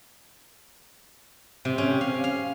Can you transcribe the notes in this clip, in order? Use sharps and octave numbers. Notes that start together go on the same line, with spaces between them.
C3
C#4
F5
F5